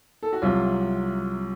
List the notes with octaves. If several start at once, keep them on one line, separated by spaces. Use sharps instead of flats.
A4
F#4
C2 C3 F#3 F4